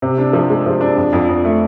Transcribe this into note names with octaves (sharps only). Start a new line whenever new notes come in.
C3
D4
F3
G#3
F3
D4
F2
F2
F2
A3